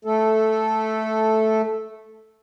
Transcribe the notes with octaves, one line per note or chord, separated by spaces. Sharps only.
A3 A4